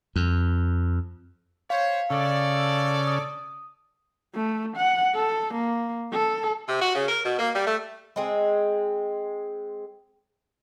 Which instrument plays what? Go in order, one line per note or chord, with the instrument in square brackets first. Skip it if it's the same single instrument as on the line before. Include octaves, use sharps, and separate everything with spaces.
[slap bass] F2
[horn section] C5 C#5 [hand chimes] F5
[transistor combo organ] C#3 [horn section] A4 D5
[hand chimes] D#6
[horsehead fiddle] A3
F#5
A4
A#3
A4
[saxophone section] C3
F#4
C#3
A#4
B2
A#3
G3
A3
[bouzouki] G#3 C4 G#4